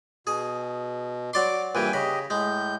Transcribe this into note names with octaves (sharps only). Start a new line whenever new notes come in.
B2 G#4
F#3 D5 C6 D6
A#1 G2 E3 B4 G5 G#5
C#3 G4 D#5 B5
A2 G#3 G6